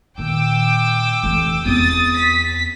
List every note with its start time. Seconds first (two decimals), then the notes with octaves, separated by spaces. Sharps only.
0.18 A#2 D#3 G5 D6 E6
1.23 F1 E3
1.65 E2 C4 D#6 A6
2.17 B6